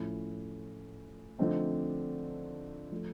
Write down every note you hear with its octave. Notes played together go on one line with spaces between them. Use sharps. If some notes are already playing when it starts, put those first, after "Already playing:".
Already playing: A2 F3 A3 C#4 E4
D3 F3 A3 C4 D#4
F3 A3